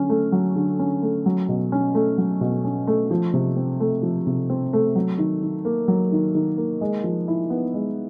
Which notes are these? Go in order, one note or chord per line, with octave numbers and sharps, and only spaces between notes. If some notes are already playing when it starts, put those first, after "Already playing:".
Already playing: D3 F#3 C#4
A3
F#3
D3
C#4
A3
F#3
B2
C#4
A3
F#3
B2
C#4
A3
F3
C3
C4
A3
F3
C3
C4
A3
F#3
D#3
D#3
A#3
F#3
D#3
D#3
A#3
G#3
F3
E4
B3
G#3